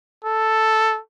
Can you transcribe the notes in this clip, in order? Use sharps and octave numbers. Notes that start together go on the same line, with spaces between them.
A4